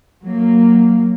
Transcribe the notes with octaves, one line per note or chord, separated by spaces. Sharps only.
F#3 A#3